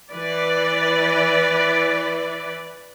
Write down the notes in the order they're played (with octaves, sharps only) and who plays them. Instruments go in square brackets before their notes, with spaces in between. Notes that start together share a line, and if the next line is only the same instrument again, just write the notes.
[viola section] E3 B4 D5